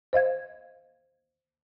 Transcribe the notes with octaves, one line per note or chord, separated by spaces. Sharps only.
C5 D#5 F5 G#6